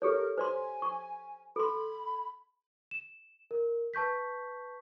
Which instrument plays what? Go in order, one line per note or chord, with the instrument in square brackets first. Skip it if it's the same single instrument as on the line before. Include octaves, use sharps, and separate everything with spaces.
[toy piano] G4 A4 C#5 [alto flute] A#4
[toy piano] C5 D5 C6 [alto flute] G#5
[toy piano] C#6
[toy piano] A4 C6 [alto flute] B5
[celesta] E7
A#4
B4 A5 C#6 G6 B6